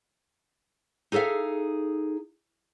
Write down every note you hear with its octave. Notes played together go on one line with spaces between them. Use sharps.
D#4 G#4 A4 E5 F5